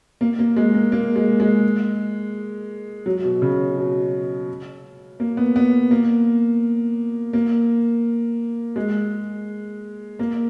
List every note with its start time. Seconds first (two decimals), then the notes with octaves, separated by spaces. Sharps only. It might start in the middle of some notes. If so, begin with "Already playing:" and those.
0.21 A#3
0.39 A#3
0.56 G#3
0.74 A#3
0.92 A#3
1.16 G#3
1.40 G#3
3.06 F#3
3.24 B2
3.42 C#3
3.77 B2
5.20 A#3
5.37 B3
5.56 B3
5.91 A#3
7.33 A#3
8.76 G#3
10.19 A#3